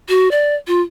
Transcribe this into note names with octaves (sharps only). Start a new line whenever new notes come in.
F#4
D5
F4